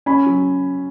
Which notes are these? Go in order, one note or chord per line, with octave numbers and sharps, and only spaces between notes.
C#4 B5
F#3